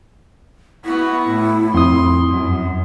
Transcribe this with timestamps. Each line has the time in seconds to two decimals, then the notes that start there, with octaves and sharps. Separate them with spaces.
0.85 B3 E4 F#4
1.28 A2
1.74 F2 C6 D#6
2.31 F#2